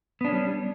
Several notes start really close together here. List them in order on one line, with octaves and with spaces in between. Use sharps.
B3 D4 C#4 G3